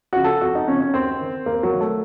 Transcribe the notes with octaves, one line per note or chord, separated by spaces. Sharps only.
C#3 F3 F#4
A4
F2 F#4
D#4
C#3 F3 C#4
C#4
D#2 C4
D#3
D#2 A#3
F#3
D#3
A3